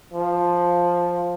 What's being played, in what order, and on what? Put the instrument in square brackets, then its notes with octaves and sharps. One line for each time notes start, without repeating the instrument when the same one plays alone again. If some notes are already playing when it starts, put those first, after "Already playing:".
[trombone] F3